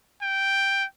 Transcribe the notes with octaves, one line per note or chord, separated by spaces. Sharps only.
G5